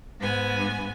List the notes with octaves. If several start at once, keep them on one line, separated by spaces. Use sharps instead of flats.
G#2 B3 G#5